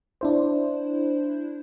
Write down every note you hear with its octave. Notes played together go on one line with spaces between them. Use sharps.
D4 E4 C5